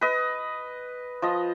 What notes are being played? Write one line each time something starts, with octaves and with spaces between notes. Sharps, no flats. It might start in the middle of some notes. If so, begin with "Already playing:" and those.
B4 D#5
F3 D#5